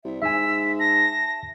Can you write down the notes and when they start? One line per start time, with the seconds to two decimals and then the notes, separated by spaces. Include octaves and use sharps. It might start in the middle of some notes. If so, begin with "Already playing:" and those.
0.05 C2 E5
0.22 G#2 E5 G#5 E6 B6
0.79 A5 A#6